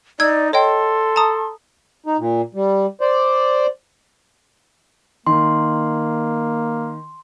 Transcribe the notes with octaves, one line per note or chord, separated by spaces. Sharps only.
D#4 D5 E6 G#6
A4 C#5 D#5 G5 C6
A5 A#5 D#6
D#4
A#2
G3
C5 D5
D#3 A#3 C6